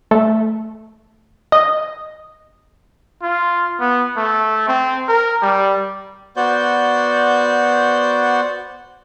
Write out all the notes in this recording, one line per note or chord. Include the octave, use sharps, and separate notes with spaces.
A3
D#5
F4
B3
A3
C4
A#4
G3
B3 F#4 C5 D5 G6